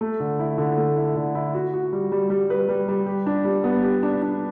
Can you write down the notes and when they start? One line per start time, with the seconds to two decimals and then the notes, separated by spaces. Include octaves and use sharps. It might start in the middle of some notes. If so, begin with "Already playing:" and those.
0.01 A3
0.20 D3
0.39 E4
0.58 D3
0.78 A3
0.96 E4
1.16 D3
1.35 E4
1.54 F#4
1.74 F#4
1.93 G3
2.12 G3
2.30 G3
2.50 B4
2.69 G3
2.88 G3
3.06 G4
3.26 D4
3.44 G3
3.64 B3
3.83 G4
4.03 D4
4.22 D4